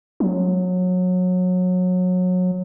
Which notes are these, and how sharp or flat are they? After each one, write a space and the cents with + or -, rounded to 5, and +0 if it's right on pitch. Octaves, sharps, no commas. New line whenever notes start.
F#3 -25